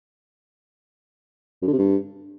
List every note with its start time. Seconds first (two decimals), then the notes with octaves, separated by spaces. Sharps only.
1.62 F#2
1.67 D3
1.73 C3
1.78 G2